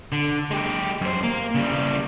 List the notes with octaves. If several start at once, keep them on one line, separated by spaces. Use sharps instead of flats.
D3
G#3 G4
F#2 C5
A#3
C#3 G3